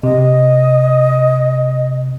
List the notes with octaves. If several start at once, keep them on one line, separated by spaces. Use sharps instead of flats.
C3 D#5